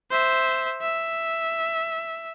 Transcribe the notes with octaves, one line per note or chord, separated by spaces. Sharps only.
C5 E5
E5